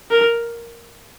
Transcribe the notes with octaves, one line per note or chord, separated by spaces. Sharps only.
A#4